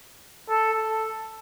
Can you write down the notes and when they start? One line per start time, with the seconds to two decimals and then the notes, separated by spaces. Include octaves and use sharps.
0.50 A4